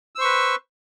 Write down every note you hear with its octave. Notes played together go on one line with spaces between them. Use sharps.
B4 C5 C#6 E6